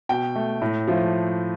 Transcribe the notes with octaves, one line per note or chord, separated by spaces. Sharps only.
B2 G5
A3
A2
F3 A3